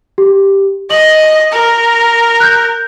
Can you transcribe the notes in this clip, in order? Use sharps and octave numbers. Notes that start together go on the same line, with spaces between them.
G4
D#5 F#7
A#4
F#6 G6